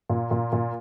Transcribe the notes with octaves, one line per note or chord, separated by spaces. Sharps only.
A#2
A#2
A#2